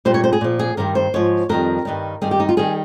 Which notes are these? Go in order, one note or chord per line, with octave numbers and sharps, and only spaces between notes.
A#2 G3 C5
C#5
C5
G#4
A#2 F3
G#4
G2 D#3 G3 A#4
C5
G#2 F3 C#5
F2 D#3 G3 A#4
G2 D#3 G3
G2 D#3 G3 G#4
G4
D#4
F4
D#3 G3 G#4